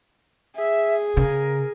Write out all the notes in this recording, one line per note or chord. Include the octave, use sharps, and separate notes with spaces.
G#4 E5
C#3 A#4